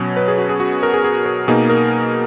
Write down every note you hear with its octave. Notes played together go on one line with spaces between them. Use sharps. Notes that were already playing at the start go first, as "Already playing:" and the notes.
Already playing: B2 F#3 C#4 C#5
B4
G#4
F#4
G#4
F#4
A#4
G#4
G#4
A#4
B2 A#3 D#4 G#4
A#4